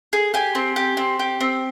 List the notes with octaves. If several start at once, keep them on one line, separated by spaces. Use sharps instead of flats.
G#4
G4 G#5
C4
G4
C4
G4
C4